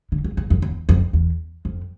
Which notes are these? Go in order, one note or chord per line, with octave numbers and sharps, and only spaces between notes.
D3
E2
E2
F2
E2
F2
E2
F2